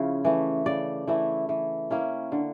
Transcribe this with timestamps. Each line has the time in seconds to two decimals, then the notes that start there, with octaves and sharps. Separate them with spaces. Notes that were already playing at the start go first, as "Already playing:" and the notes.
Already playing: C#3 F3 C#4 E4
0.25 E3 A3
0.66 C#3 D5
1.08 E3 A3 E4
1.49 E3
1.91 A#3 C#4 E4
2.32 D3